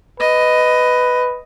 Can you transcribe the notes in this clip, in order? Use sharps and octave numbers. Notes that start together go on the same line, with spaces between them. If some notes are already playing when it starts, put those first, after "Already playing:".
B4 D#5